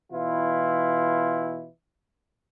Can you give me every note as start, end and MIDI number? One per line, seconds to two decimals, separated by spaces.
0.12 1.68 47
0.12 1.68 52
0.12 1.68 64
0.12 1.68 65